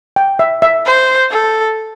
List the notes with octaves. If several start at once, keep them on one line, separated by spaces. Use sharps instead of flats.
G5
E5
E5
C5
A4